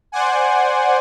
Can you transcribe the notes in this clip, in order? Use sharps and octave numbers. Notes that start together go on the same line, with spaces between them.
C5 D5 F#5 G#5